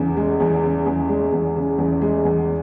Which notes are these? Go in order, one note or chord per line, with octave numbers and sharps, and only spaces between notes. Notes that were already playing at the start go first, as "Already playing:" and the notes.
Already playing: E2 C#3
G#3
E2
C#3
E2
G#3
E2
C#3
E2
G#3
E2